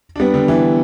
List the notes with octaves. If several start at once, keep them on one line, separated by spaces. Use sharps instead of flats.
D4
G3 B3
D3 G3
E3